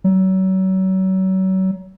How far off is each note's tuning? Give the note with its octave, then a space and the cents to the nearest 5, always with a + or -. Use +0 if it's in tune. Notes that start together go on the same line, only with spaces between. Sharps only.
F#3 +35